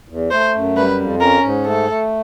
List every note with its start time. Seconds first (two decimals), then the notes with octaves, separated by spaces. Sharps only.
0.09 E2
0.31 A3 C5
0.54 F#2
0.77 G3 B4
1.00 F2
1.21 C#4 A#4
1.43 G#2
1.66 A3 A4
1.89 A3